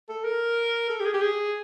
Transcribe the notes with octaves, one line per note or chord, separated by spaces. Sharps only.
A4
A#4
A4
G4
G#4
G4
G#4